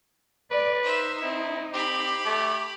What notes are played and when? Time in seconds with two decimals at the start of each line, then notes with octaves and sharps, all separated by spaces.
0.51 B4 D5
0.83 D#4 C5 E5
1.22 C4 E4
1.73 C4 G4 B5 D6
2.25 A3